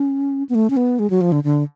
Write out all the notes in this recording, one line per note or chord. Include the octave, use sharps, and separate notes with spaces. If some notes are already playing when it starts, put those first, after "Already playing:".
Already playing: C#4
B3
A3
C#4
B3
G#3
F#3
F3
D3
D3